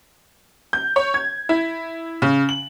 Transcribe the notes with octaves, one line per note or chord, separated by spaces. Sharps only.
G6
C#5
G#6
E4
C#3
F#7